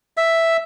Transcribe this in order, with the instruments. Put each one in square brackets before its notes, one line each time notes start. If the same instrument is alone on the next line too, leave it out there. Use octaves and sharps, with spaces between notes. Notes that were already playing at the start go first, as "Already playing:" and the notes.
[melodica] E5